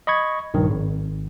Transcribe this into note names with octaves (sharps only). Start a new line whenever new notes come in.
D#5 B5 C#6 G#6
A#1 G2 D#3
G#1